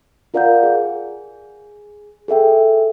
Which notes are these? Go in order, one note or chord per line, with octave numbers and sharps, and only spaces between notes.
F4 A#4 D5 F5 F#5 G6
G#4
G#4 A4 E5 G5